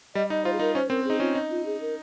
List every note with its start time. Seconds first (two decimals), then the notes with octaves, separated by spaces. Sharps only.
0.15 G3 D#5
0.30 D#4 D#5
0.45 F4 C5
0.53 G#4
0.59 D#4 A#4
0.75 C#4 C5
0.90 C4 A#4
1.05 D#4 G#4
1.20 C#4 F4
1.35 D#4
1.51 F4
1.66 G#4
1.81 A#4